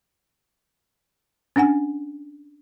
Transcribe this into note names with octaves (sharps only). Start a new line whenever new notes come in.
C#4 D4 F#5 G#5